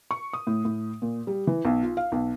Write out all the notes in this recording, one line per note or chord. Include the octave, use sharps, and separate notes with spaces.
C#6
D#6
A2
A2
A#2
G3
E3
B1
F4
F5
B1